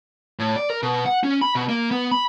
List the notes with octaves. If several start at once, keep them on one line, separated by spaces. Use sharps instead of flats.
A2
D5
A#4
B2
F#5
C#4
B5
B2
A#3
B3
B5